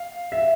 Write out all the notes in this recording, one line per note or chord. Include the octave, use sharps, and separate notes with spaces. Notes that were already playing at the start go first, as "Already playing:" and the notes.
Already playing: F5
E5